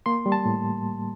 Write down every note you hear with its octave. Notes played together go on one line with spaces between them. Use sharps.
A#3 C6
G3
A5
A2